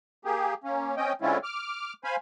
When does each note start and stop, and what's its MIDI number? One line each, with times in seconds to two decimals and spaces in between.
0.25 0.54 58
0.25 0.54 67
0.25 0.54 68
0.64 0.96 58
0.64 0.96 61
0.97 1.13 60
0.97 1.13 61
0.97 1.13 75
0.97 1.13 79
1.22 1.38 50
1.22 1.38 56
1.22 1.38 60
1.22 1.38 61
1.22 1.38 64
1.22 1.38 65
1.44 1.93 86
1.44 1.93 89
2.04 2.16 72
2.04 2.16 77
2.04 2.16 80
2.04 2.16 83